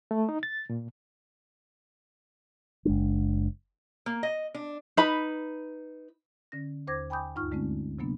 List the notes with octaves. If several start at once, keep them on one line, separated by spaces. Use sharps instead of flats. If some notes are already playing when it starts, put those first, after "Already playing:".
A3
D#4
A6
A#2
F#1 G#3 D4
A#3
D#5
D4
D#4 B4 B5
D3 C#4 A#6
D#2 C5 D6 G#6 A#6
G5 G#5 B5 D6 D#6 G6
D2 G2 D#4 F4 C#6 F6
D3 G#3 A3 C4 C#4
C3 F#3 A#3 B3 D4